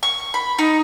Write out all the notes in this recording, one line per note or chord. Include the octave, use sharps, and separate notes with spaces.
C#6
B5
D#4